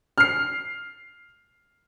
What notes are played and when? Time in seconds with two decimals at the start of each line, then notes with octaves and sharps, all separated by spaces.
0.18 F6 C7